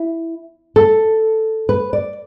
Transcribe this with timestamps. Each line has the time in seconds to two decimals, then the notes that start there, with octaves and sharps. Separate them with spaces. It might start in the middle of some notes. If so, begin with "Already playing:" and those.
Already playing: E4
0.76 A4
1.69 B4
1.93 D5